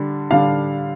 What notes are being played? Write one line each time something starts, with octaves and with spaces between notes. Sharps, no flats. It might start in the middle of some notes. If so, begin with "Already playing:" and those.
Already playing: D3 G3 D4
D3 G3 D4 F5